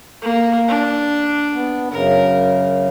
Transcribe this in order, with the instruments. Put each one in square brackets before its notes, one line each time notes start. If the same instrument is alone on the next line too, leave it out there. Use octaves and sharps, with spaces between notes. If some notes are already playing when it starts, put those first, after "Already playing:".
[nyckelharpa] A#3
D4
[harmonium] B3
[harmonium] F#2 C#3 [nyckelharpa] A#4